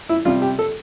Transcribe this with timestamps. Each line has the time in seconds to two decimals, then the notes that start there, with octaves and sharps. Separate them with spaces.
0.09 E4
0.25 C3 G3 F4
0.42 G4
0.59 A4